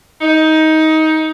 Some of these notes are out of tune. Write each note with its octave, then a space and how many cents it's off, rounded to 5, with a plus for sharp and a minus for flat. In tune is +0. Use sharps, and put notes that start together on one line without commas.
D#4 +20